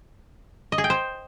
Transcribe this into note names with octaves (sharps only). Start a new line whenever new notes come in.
D#5
G#4
G5
C5